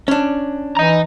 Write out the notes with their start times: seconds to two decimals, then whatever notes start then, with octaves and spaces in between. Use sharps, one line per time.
0.08 C#4 D4
0.77 E3 D#5 A#5